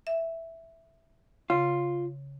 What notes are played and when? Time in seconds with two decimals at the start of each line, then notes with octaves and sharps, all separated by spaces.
0.07 E5
1.50 C#3 F4